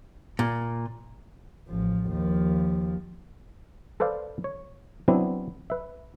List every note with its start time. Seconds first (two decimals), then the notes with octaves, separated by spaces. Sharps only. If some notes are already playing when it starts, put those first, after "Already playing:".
0.39 A#2
1.68 A1 F3
2.08 D#2 F3
4.00 A4 B4 C5 D5 F5
4.44 C#5
5.08 F#3 B3 C4 D4 E4
5.70 B4 E5